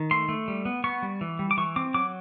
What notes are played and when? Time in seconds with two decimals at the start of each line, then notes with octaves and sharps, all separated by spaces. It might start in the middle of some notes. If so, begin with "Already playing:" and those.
Already playing: D#3
0.11 A3 C6
0.29 A3
0.48 G3
0.65 B3
0.84 B3 C#6
1.02 G3
1.21 E3
1.39 G3
1.51 D6
1.57 E3 C#6
1.76 C4 D6
1.94 F#3 D6